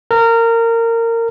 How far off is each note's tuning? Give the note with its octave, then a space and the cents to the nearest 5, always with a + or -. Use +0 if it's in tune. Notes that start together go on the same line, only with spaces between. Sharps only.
A#4 -20